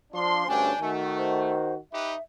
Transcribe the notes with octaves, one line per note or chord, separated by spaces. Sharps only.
F3 D4 C6
D2 G2 C#4 D4 G5 G#5
D#3 A3 F#4
C5
D#4 G4 B4 E5